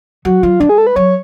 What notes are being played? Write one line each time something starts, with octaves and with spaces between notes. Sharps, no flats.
F#3 F#4
F#3 F4
G#3 D4
G#4
A4
B4
F#3 C#5